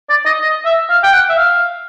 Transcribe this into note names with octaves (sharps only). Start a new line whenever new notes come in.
D5
D#5
D#5
E5
F5
G5
F#5
E5
F5